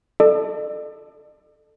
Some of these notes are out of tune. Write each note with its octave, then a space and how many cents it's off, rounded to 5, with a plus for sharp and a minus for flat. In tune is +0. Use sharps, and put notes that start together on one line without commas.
A4 +0 D5 +45